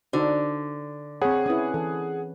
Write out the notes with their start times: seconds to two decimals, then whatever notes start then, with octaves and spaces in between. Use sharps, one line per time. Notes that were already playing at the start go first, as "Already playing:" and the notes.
0.13 D3 D#4 F#4 C5
1.22 C4 G#4 C#5 F#5 B5
1.46 C#4 E4 B4 D#6
1.74 E3 A4